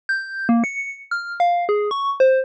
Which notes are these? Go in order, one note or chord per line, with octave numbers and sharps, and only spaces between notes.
G6
A#3
C#7
F6
F5
G#4
C#6
C5